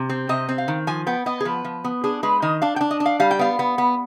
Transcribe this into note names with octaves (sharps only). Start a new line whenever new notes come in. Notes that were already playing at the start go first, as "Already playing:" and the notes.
Already playing: C3
C4
C3 D#5
C4
F5
D#3
F3 G#5
B3 G5
B3 D#5
G#4
F3 B4
F3
B3
D4 G#4
G#3 B4
D#3 D#5
D4 F5
G5
D4
D#5
D4
F5
G3 F5
G5
B3 F5
B3
B3